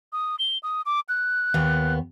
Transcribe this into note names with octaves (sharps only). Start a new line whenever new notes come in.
D#6
G7
D#6
D6
F#6
D#2 B3